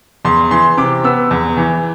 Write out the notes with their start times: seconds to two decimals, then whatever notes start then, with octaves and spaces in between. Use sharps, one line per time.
0.25 E2 C6
0.51 E3 C6
0.78 C3 D6
1.04 B3 E6
1.31 E2
1.57 E3